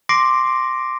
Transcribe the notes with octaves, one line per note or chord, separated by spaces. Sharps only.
C6 D6 A#6 C7 D7